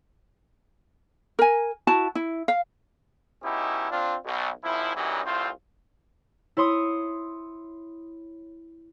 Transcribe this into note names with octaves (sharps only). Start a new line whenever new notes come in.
A#4 G#5
E4 F#4 A5
E4
F5
B2 C#4 D#4 E4 G4
C4 D4 F4
B1
G#1 F3 E4
F#2 E3 F#3 G3 D#4
C2 A2 C4 F4 C5
E4 C#5 C6 D#6